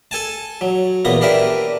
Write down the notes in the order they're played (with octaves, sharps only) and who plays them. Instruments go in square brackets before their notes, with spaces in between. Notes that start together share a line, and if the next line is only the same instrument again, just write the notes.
[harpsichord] A4 G#5 A5
F#3
E2 A#2 B3 A#5
D4 G4 A#4 B4 E5